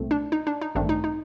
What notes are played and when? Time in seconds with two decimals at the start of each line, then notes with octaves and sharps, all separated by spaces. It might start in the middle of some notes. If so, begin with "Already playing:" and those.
Already playing: C2 A#2 A3 C4
0.11 D4
0.32 D#4
0.47 D4
0.61 D#4
0.75 A1 G2 D#3 A3 C4 D4
0.89 D#4
1.04 D#4